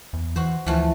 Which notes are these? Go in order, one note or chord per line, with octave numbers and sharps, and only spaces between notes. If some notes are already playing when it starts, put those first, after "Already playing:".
E2
E3 F#4 C5
D2 E3 F3 A3